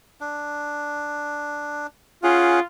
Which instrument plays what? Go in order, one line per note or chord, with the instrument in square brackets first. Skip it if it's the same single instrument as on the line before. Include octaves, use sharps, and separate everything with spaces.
[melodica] D4
[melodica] C#4 G#4 F#5 [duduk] F4